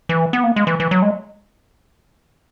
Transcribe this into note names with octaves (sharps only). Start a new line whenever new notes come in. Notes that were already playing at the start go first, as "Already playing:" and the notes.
E3
B3
A#3
G#3
E3
E3
F#3
G#3